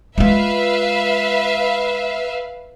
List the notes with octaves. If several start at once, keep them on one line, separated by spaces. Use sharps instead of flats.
G#3 F4 B4 E5 F5